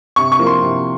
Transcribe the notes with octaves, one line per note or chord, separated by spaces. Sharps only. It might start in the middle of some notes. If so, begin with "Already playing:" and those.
C3 C#6
C#6
F3 A#3
C6
C3